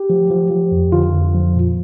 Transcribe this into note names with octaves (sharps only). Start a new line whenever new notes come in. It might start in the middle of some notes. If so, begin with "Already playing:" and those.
Already playing: G4
F3
F3
F3
F2
D3 F4
F2
F3
A#2